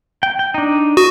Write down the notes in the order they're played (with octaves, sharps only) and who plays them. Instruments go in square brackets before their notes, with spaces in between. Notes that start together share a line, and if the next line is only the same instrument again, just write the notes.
[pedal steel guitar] G5
G5
D4 D#4
[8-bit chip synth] F#4 [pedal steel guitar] D#6